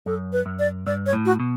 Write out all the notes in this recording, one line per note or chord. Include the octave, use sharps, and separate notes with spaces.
F#2 A4
B4
F#2
D5
G2 D5
C#5
A2
F#4
B2